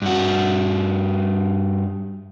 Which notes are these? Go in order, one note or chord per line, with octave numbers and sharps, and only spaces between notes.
G2 F#4